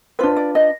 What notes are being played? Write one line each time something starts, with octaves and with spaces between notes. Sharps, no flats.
D4 F4 B4 C5
D5
D#5